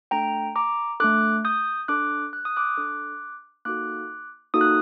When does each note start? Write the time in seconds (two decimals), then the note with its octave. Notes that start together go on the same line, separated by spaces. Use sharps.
0.11 A3 D4 A4 G5 A#5
0.56 A#5 D6
1.00 A3 D4 A4 D6 F#6
1.45 D#6 G6
1.88 D4 A4 D6 F#6
2.33 F#6
2.45 D#6
2.56 D6 F#6
2.77 D4 A4
3.65 A#3 D#4 F#4 A4 D6 F#6
4.54 A#3 D#4 F#4 A4 D#6
4.61 F#6